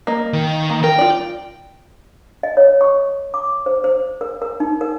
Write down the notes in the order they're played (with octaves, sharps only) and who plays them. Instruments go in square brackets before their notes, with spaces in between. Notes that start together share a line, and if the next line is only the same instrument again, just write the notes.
[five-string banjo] A#3 D#5
[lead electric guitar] D#3
[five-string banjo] A#3
[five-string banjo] A#4 [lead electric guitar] G5
[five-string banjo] F4 D5
[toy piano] D#5
C#5
C#6
D6
C5
C5
A#4
A#4
D#4
A#4